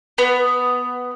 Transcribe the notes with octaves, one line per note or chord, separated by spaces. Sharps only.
B3